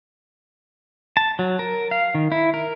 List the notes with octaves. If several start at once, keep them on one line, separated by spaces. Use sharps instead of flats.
A5
F#3
A#4
F5
D#3
E4
A#4